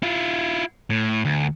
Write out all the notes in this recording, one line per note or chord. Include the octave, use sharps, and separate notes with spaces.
E4 F4
A2
D2